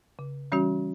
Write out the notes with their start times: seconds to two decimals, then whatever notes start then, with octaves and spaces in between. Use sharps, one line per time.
0.19 C#3
0.52 E3 G3 C#4 F#4